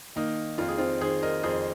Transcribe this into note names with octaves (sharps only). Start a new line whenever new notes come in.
D#3 A#3 D#4
F2 F4
G#4
C4 F4
D#3 G#4 C5
A#4 D#5
F2 G#4 C5